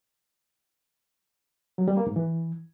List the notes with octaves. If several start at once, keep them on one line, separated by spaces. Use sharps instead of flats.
F#3
G3
A#3
G#2
E3